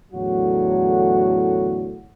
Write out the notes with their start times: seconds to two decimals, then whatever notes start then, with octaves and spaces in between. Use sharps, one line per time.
0.12 E2 A2 D3 F#3 F#4